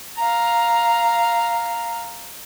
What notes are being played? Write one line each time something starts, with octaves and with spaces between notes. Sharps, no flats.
F5 A#5